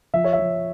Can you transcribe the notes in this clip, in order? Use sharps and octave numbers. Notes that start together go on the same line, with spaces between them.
F3 E5
C#5
E5
F3